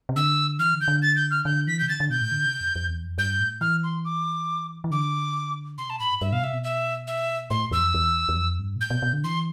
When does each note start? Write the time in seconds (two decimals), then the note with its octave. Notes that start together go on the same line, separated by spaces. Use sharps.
0.09 C3
0.16 D3 E6
0.59 E3 F6
0.74 D3
0.81 G6
0.88 D3
1.02 A6
1.16 G6
1.31 F6
1.45 D3 G6
1.67 E3 B6
1.79 C3 G6
1.89 D3 A6
2.00 D3
2.10 B2 G6
2.21 A2
2.31 D3
2.46 C3
2.61 F2
2.76 F2
2.89 E2
3.03 F2
3.18 G2 G6
3.40 A2
3.61 E3 F6
3.83 C6
4.05 D6
4.84 E3
4.91 D3 D6
5.78 C3 C6
5.88 B2 A5
5.99 A2 B5
6.11 G2
6.21 G2 E5
6.32 B2 F5
6.42 C3 E5
6.53 B2
6.64 E5
7.07 E5
7.50 A2 C6
7.71 E2 E6
7.79 F2
7.94 E2
8.29 E2
8.36 F2
8.59 G2
8.76 B2
8.80 A2 G6
8.90 B2
9.02 B2
9.13 D3
9.24 E3 C6